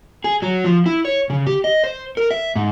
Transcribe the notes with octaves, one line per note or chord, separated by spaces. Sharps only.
G#4
F#3
F3
E4
C#5
C#3
G4
D#5
C5
A#4
E5
G#2